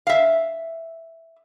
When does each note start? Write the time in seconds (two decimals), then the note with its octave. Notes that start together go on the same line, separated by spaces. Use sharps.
0.07 E5 F5